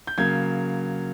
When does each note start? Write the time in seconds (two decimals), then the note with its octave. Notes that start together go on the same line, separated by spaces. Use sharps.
0.07 G6
0.18 C#3 F#3 A#3 G#6